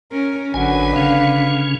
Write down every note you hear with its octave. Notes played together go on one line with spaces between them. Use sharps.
C#4 A#4
G#1 D3 F#3 B4 G#5
C#3 C#4 F5